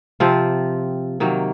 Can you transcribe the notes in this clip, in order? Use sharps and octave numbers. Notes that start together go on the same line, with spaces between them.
C3 F3 C4 F4
C3 D#3 F#3 A#3